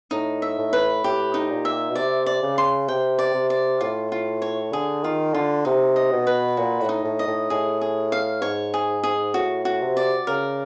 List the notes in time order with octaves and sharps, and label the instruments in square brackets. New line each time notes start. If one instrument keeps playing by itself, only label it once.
[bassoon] A2 [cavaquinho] D#4
[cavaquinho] E5
[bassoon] A2
[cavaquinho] B4
[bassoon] A2 [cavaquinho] G4
[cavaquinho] D#4
[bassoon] A#2
[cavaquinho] E5
[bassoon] B2
[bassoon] C3 [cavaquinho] D5
[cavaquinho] D5
[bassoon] C#3
[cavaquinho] C6
[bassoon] C3 [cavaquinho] G5
[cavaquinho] D5
[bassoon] C3
[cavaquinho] D5
[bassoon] A2 [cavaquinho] F4
[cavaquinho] F4
C#5
[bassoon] D3 [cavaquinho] G#4
[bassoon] D#3 [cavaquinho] F4
[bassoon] D3 [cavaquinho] F4
[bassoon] C3 [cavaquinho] D#4
[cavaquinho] D#5
[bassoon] B2
[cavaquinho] B4
[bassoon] A#2 [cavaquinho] F#4
[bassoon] A2
[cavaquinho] D#4
[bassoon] A2
[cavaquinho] D#5
[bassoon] A2
[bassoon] A2 [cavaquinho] G#4
[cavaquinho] G#4
F5
[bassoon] G#2 [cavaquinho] C#5
[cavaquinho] G#4
G#4
[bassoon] A2 [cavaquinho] F#4
[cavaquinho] F#4
[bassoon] C3
[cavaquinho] D5
[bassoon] C#3 [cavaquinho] A#4